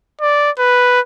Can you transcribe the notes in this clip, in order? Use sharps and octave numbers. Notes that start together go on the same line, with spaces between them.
D5
B4